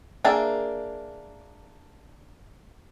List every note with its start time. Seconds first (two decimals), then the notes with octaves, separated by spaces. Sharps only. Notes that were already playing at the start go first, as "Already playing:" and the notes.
0.25 A#3 D4 G#4 E5 A5